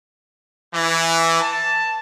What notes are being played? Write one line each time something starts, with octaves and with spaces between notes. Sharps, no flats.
E3
A5